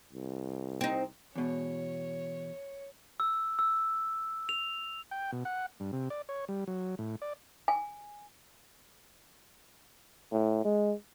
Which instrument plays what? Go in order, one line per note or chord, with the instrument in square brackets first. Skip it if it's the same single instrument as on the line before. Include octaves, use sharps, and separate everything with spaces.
[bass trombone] C2
[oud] C4 D#4
[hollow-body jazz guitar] E2 B2 [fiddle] C#5
[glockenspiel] E6
E6
F7
[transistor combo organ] G5
B2
F#5
G2
C3
D5
C#5
G3
F#3
A2
D5
[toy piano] G#5
[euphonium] A2
G#3